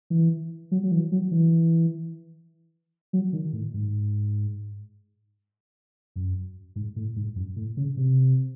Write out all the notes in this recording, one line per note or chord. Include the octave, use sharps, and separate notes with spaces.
E3
F#3
F#3
E3
F#3
E3
F#3
D#3
A2
G#2
F#2
G#2
A2
G#2
F#2
A2
C#3
C3